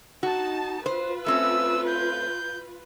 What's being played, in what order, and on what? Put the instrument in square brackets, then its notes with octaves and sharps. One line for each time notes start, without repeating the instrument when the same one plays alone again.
[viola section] D#4 A5 [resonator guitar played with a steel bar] F#4
[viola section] F4 B4 [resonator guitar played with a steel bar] C5
[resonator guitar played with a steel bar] A3 C4 C#4 [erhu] E6
[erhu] G6